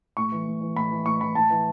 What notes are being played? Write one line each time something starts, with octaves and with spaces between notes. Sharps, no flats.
A2 C#6
E3
A2
E3
A2 B5
E3
A2 C#6
E3 B5
A2 A5
E3